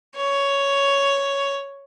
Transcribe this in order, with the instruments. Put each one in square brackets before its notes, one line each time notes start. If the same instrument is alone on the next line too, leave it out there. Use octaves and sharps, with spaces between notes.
[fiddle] C#5